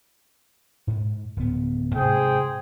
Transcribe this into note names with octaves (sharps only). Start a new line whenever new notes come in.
G#2
D1 B3
G#2 C3 G#4 C5 G5